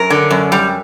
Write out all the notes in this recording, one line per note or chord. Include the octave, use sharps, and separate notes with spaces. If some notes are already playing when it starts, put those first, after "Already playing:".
Already playing: F#2 A#4
D3
F#2
G3